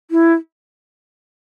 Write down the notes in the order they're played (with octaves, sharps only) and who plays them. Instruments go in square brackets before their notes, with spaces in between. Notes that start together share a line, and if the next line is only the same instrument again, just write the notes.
[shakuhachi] E4